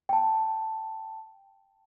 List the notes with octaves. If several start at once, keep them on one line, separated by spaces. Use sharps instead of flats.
G5 A5